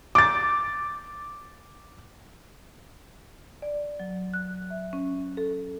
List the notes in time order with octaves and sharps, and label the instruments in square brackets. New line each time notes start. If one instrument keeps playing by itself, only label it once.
[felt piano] D6 A6
[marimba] D5
F#3
F#6
E5
C#4
A4